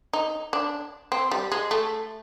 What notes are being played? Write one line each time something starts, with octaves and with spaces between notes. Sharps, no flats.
D#4
D4
C4
G3
G#3
A3